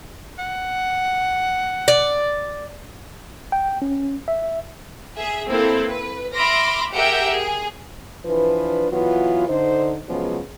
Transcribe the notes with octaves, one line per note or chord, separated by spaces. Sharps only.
F#5
D5
G5
C#4
E5
G#4 E5
A#3 C4 E4 A4 A#4
B4
E5 B5 C6 D6 F6 A#6
G4 G#4 A#4 E5 F#5 G5
G#4
E3 F3 D4 B4
E3 F#3 B3 F4
D3 D#4 C5
C#3 F3 F#3 G#3 B3 C#4